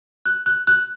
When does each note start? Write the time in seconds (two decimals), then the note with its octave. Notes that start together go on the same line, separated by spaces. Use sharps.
0.25 F#6
0.46 F#6
0.67 F#6